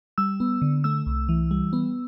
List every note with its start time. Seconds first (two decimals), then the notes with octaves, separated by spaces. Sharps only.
0.18 G3 E6
0.40 B3
0.62 D3
0.84 A3 E6
1.06 C2
1.29 E3
1.51 G3
1.73 B3